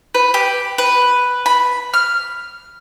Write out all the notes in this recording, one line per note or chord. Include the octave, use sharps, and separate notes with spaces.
B4
G4
B4
B5
F6